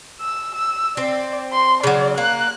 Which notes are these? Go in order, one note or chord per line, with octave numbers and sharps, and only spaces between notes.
E6
E6
C4 D5
C6
C#3 F#3 D5
A#3 F#6